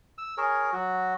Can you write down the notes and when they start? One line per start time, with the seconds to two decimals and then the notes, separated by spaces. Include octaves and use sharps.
0.18 E6
0.38 G#4 A#4 C#5
0.72 F#3 F#4